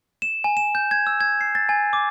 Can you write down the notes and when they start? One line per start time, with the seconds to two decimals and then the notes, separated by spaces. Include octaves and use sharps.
0.22 E7
0.44 G#5
0.57 E7
0.75 G6
0.91 G#6
1.07 E6
1.21 G#6
1.41 C7
1.55 A6
1.69 G#5
1.93 D6